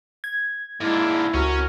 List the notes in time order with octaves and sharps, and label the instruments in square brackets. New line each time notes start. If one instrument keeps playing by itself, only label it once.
[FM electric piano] G#6
[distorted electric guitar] G#2 D4 [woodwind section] G#3 A#3 [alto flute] E4
[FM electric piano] C#2 [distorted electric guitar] C#4 [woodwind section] F#4 A#4